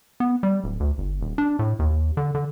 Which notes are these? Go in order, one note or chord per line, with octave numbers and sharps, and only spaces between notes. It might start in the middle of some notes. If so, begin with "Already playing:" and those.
B3
G3
D1
D2
G1
D#1
D4
A2
D#2
D3
D3